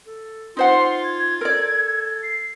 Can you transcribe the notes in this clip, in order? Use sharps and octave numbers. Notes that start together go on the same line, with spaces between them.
A4
D#4 F4 C5 F#5 C6
G#6
A4 A#4 D5
C7